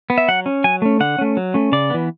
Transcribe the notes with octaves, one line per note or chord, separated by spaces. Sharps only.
B3
E5
F#3 F#5
C#4
F#3 G#5
A3 C#4
D3 F#5
A3 C#4
F#3
A3 C#4
C#3 D5
E3 B3